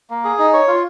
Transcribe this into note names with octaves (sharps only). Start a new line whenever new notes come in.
A#3
G#4
D#4
C#5
F4